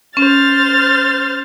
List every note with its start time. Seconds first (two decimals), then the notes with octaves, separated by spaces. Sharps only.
0.17 C#4 C5 F6 A6